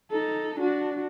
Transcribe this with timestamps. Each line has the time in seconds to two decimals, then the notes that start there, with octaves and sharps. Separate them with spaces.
0.11 D#4 A4
0.59 D4 F#4